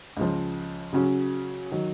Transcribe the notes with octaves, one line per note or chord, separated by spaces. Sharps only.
C#2 C#3 F3
C#3 F#3 C#4 F#4
D#3 F#3